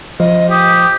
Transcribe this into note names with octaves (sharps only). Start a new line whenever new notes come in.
F3 D#5
G4 D#6